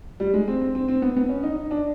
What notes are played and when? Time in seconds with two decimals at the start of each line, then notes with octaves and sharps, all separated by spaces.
0.20 G3
0.34 G#3
0.48 C4
0.62 C4
0.75 C4
0.88 C4
1.02 B3
1.16 B3
1.29 C#4
1.43 D#4
1.57 D#4
1.71 D4